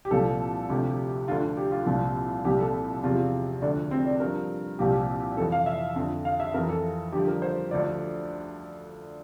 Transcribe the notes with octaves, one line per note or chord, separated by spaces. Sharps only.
G4
C2 A#2 F3 A4
D2 C3 F3 G4
D2 D3 F3 F4
G4
F4
C2 A#2 F3 F4
C2 A#2 F3 G4
A4
E2 C3 F3 F4
D2 D3 F3 D4
C4
D4
G2 F3 A#4
C2 A#2 F3 G4
F2 E3 A4
F5
E5
F2 D3 F3
F5
E5
F2 E3 A#4
A4
G2 D3 F3 G4
A#4
C5
D2 D3 F3 D5